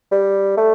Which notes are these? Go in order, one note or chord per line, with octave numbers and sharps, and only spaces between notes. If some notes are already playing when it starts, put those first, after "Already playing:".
G3
A3